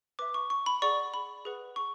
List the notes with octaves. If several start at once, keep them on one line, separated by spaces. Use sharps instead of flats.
B4 E5 D6
C#6
C#6
B5
G#4 D5 F#5 C#6
B5
G#4 B4 F#5
C#6